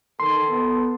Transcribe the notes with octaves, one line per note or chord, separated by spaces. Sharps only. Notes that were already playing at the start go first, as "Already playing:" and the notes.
D#3 A4 C6
B3